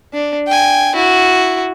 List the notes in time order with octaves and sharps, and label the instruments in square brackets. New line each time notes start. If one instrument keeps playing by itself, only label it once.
[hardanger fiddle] D4
G5 G#5
E4 F#4